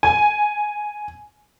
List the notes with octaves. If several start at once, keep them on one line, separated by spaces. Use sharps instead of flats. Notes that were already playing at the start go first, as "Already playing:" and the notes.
G#5